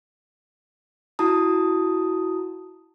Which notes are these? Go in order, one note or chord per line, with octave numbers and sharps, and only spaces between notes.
E4 F#4 A5 A#5 D#6